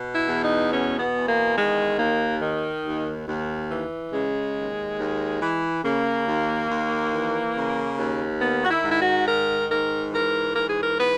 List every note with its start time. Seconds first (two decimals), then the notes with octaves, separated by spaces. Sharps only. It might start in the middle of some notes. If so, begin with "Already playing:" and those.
Already playing: B2
0.14 E4
0.28 E2
0.42 D#4
0.71 B2 C#4
0.98 B3
1.14 E2
1.28 A#3
1.56 D#3 G#3
1.98 D#2 A#3
2.41 D#3
2.84 D#2
3.28 D#2
3.71 E3
4.12 C#3 G#3
4.56 D#2
4.99 D#2
5.41 E3
5.84 C#3 A#3
6.27 D#2
6.69 D#2
7.13 E3
7.55 C#3
7.99 D#2
8.41 D#3 B3
8.64 F#4
8.69 E4
8.84 G#2
8.90 E4
8.99 F#4
9.26 D#3 A#4
9.69 G#2 A#4
10.12 E3 A#4
10.55 G#2 A#4
10.69 G#4
10.81 A#4
10.97 E3 B4